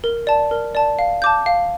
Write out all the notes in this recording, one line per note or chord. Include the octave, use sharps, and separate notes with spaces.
A#4
D5 A5
A#4
D5 A5
F5
A5 D6 G6
F5